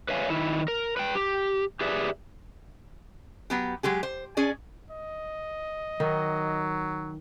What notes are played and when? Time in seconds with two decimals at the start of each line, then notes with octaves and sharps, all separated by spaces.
0.09 B4 C#5 E5 F5 G#5
0.29 D#3 E4
0.68 A#4
0.97 B4 G5
1.15 G4
1.81 G4 G#4 B4 D5 E5
3.50 F#3 B3 G4
3.83 F#3 G#3 G4 G#4
4.03 C5
4.37 C#4 G#4 D5
4.91 D#5
6.00 D#3 F#3